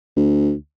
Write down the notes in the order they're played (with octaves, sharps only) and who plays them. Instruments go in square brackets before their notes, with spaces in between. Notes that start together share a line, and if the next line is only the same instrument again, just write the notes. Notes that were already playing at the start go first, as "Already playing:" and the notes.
[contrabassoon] D2